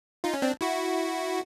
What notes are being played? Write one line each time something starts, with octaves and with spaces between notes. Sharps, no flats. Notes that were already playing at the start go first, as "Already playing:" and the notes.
D#4 F4
C#4
C4 D4
E4 F#4